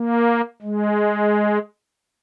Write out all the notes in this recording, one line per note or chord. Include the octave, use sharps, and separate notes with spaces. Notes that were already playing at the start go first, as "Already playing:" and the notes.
Already playing: A#3
G#3